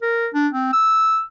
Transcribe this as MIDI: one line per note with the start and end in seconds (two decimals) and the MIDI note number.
0.02 0.28 70
0.34 0.48 62
0.53 0.73 60
0.73 1.21 88